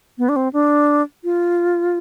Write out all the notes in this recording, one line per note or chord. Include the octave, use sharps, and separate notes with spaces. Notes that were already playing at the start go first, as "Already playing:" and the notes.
B3
D4
C4
D4
F4